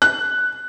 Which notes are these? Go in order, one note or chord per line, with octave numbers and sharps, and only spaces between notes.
F#6